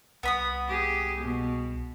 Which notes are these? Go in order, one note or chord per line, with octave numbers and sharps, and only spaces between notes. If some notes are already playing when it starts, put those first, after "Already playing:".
C2 B3 B5 D#6
G4 G#4
B2